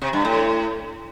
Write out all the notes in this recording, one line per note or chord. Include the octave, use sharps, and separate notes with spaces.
C3
G2
A2